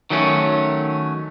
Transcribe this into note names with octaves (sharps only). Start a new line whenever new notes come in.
D#3 F#3 A3 C#4